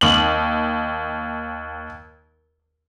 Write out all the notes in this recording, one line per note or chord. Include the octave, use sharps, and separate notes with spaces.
D#2 F#7